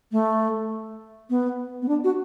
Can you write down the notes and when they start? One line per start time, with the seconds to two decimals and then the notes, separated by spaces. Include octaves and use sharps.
0.12 A3
1.30 B3
1.82 B3
1.88 D4
2.04 F#4